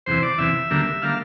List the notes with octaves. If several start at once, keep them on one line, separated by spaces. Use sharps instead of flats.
E2 C3 E3 C5
D5
E2 C3 E3 E5
D2 D3 G3 A#3
D3 G3 A#3 F5